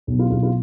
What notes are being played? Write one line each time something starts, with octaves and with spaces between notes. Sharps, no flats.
B1
F4
B1 F4
F4